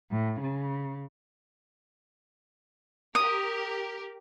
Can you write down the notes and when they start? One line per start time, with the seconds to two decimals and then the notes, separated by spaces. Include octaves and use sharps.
0.11 A2
0.42 C#3
3.15 G4 A#4 D#6